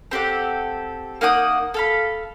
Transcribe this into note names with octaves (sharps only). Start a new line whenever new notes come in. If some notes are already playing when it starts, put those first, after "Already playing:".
C4 G4 A4 F#5
A#3 D#4 F#5 D#6
A4 F5 B5